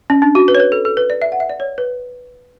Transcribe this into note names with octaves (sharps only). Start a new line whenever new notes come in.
C#4
D4
F#4
B4
C#5
B4
A4
A4
B4
D5
E5
F#5
E5
D5
C#5
B4